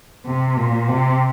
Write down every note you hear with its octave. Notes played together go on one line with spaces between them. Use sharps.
C3
A#2
C3